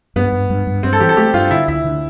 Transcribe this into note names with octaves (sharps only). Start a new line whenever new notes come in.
G2 B3
G2
G2
G2
G2 C4
A4
E3 G4
A4
A3 G4
G2 F4
D3 E4
D2 E4
D3